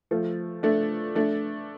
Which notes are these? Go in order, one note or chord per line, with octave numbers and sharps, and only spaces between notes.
F3 A3
A3 D4
A3 D4